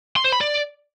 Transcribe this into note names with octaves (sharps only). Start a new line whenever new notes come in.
C6
C5
B5
D5